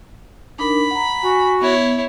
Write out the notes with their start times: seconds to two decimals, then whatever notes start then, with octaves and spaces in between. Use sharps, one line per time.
0.59 D4 D#4 A#4 B5
0.91 F#5 A#5
1.23 F#4 G#5
1.61 B3 E4 C#5